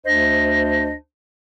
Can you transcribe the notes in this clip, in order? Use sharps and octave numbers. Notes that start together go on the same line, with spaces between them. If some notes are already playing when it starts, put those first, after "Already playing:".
D2 D4 C5 D#5